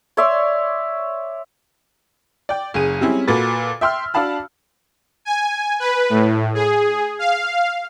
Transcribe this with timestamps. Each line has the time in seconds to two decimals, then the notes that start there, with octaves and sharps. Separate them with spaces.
0.17 C#5 D5 E5 C6
2.49 D5 G5
2.74 F#1 C#3 G#4 D#7
3.01 G3 G#3 C4 C#4 E4
3.28 A#2 F#4 A4 B4 A6
3.81 E5 G5 C6 E6 F6
4.14 D4 F#4 F5 A5 B5
5.25 G#5
5.80 B4
6.10 A2
6.54 G#4
7.19 F5